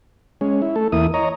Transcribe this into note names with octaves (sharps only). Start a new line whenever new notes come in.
G#3 C#4
E4
A3 A4
E2 A#3 E4 D#6
C#5 D#5 A#5